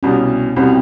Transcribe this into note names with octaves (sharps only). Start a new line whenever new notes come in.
C2 B2 G3 C#4
C2 B2 G3 C4